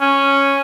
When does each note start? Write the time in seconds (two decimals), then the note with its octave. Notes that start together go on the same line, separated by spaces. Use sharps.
0.01 C#4